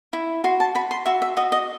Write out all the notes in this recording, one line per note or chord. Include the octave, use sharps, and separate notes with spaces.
E4
F#4 C6
A5
F#4 B5
C6
F#4 E5
E5
F#4 D#5
D#5